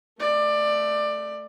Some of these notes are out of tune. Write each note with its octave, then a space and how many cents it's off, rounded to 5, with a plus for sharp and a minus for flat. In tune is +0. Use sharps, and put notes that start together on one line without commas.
A3 +0 D5 +20